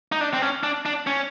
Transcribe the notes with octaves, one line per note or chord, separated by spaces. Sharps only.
D#4
D4
C4
C#4
D4
D4
C#4